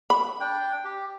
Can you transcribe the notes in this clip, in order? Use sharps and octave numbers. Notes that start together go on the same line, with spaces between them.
B5
D4 G5
G4